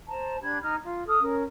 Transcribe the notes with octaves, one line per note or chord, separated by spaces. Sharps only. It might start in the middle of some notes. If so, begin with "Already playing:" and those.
C5 A5 A#5
D4 G4 B5 G#6
D#4 F6
F4
A4 D#6 F6
C#4 A#4